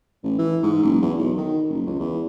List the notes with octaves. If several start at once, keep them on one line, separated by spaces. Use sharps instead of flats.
A1
E3
G#2
F#1
E2
B1
D#3
F#1
C#2
E2